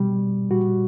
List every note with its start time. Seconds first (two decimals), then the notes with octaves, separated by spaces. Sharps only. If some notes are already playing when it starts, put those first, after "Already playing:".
Already playing: B2 G3
0.50 A#2 G3 F#4